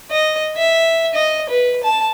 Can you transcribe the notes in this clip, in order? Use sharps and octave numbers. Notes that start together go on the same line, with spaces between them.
D#5
E5
D#5
B4
A5